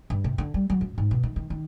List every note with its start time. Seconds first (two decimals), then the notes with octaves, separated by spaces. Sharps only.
0.10 G2
0.24 C3
0.38 D3
0.54 G3
0.70 F#3
0.81 F#2
0.98 G#2
1.11 B2
1.23 D#3
1.36 D#3
1.50 D#3